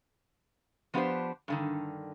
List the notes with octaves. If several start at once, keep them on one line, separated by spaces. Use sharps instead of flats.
F3 B3 D4 G4 B4 C5
G2 D3 D#3